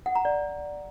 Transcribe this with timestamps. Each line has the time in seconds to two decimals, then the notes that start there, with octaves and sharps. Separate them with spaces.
0.06 F#5
0.15 A#5
0.25 D5